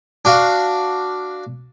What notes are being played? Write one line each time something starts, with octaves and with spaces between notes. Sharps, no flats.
D4 F#4 F5